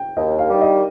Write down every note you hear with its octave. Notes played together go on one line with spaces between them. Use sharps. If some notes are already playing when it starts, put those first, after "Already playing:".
Already playing: G5
D#2 D#5
F5
D#3 G3
D#5